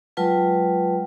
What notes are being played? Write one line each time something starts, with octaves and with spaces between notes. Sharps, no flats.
F#3 G#3 F4 B4 G5 A5